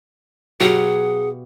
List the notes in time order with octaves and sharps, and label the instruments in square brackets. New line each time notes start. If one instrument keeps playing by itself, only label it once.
[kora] B2 G4 F5 [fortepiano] F#3 [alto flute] G#4 [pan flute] F#5